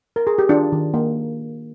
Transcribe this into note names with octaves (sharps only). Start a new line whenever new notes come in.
A#4
G#4
G4
D#3 D4 F4
D#3
A#3